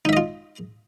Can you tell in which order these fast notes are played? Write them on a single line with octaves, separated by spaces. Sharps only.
D#4 E5 D#5 F4